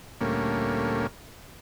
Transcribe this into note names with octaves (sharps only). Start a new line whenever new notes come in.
D2 A#2 G3 A3 A#3 C#4